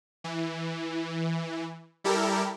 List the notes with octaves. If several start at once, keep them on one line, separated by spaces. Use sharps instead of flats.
E3
G3 E4 G4 A4 A#4